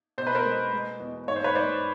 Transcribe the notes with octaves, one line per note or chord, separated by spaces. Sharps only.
B2 C5
B4
A#4 C5
G#3
G#3
E2
G#2 C#5
C5
B4 C#5
G#2 C5 D5